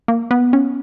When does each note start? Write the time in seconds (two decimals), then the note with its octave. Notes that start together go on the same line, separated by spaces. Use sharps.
0.08 A#3
0.31 B3
0.53 C#4